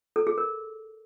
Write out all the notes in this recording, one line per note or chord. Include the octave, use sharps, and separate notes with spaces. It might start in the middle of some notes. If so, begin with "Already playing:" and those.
A4
G#4
A#4